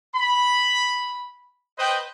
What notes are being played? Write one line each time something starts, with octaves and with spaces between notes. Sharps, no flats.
B5
B4 C5 D#5 G5